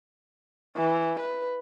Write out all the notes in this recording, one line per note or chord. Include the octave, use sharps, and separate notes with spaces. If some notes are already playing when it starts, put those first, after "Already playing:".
E3
B4